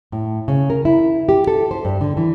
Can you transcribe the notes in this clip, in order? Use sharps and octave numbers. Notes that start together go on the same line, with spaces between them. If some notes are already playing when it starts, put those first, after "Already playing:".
A2
C#3
A#4
E4
G4
A4
C5
G2
D3
E3